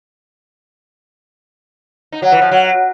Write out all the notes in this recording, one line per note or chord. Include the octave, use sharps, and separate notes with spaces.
D#4
F#3
E3
F3
F#3